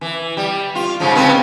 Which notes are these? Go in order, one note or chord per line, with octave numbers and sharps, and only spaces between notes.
E3
G3
F4
G#2 C#3 F3
C#3 B3 C4